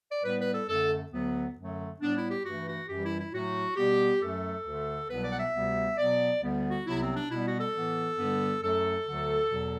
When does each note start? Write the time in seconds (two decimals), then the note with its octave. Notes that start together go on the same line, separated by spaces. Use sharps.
0.09 D5
0.23 A2 G3 B3 B4
0.39 B4
0.53 A4
0.68 F#2 D3 A3 A4
1.11 D2 D3 F#3 B3
1.56 F#2 D3 F#3 A3
2.00 A2 G3 B3 D4
2.15 E4
2.29 G4
2.44 G2 E3 A3 F#4
2.66 F#4
2.88 F#2 E3 G3 G4
3.04 E4
3.18 E4
3.32 A2 F#3 A3 F#4
3.76 B2 G3 B3 G4
4.20 F#2 F#3 A3 A4
4.64 D2 D3 A3
5.08 C2 B2 F#3 B3 B4
5.24 D5
5.31 F#5
5.38 E5
5.53 D2 C3 G3 B3
5.97 B2 F#3 B3 D5
6.41 D2 D3 G3 B3
6.70 F#4
6.85 C2 C3 F#3 B3 E4
7.00 C4
7.15 D4
7.29 B2 G3 B3 E4
7.44 F#4
7.58 A4
7.73 A2 E3 B3
8.18 G2 D3 G3 B3
8.62 F#2 F#3 A3 A4
9.06 D2 D3 F#3 A3
9.49 E2 B2 F#3